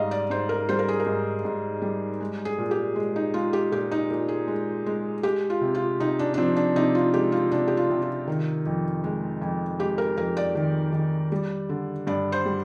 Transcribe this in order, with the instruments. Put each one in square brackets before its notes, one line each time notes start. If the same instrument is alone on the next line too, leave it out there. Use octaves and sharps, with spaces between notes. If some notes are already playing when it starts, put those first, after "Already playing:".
Already playing: [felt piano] G#2 G3 D#5 F5
D5
G#2 C5
A#4
G3 C5
A#4
G#4
A#4
G#2
G#2
G3
G#3
G#4
A#2
G4
G#3
D#4
G#3 F4
G4
A#2 G4
D#4
A#2
G#4
G#3
G#3
G#3 G4
F4
C3
F4
C3 D#4
D4
D4
F3 C4
D4
C3 D#4
F4
G#3 G4
F4
C3 D4
G4
F4
C3
F4
D#3
F2
G#3
F2
G#3 G4
A#4
F2 A#4
D5
D#3
D#3
G3
D3
G2 D5
C5
G3